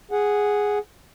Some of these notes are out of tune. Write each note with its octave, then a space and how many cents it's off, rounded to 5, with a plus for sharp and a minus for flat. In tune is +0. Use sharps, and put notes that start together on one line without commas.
G#4 +0 F#5 +0